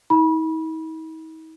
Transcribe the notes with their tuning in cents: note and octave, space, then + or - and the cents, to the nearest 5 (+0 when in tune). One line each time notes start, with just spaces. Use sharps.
D#4 +45 B5 -25